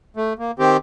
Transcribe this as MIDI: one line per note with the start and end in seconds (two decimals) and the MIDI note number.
0.17 0.33 57
0.39 0.51 58
0.59 0.77 51
0.59 0.77 60
0.59 0.77 67